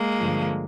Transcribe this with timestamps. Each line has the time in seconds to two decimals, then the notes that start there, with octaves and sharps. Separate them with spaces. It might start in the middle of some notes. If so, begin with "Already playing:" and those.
Already playing: G#3 A#3
0.17 G2 D3 F3